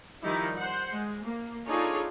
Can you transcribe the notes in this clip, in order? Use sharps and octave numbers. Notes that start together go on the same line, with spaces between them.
D#3 F3 G3 D#4 E4
C5 F#5
G#3
A#3
D4 D#4 F4 G#4 A4 C#5